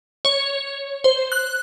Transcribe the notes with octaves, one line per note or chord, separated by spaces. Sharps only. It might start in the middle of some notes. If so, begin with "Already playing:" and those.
C#5
C5
F#6